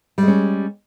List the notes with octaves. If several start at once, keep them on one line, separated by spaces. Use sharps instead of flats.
G3 G#3 C#4